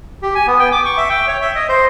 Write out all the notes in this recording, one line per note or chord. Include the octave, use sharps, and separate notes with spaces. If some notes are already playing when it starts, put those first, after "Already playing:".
G4
G#5
B3
G5
D6
C#6
E5
G5
C#5
E5
D#5
C5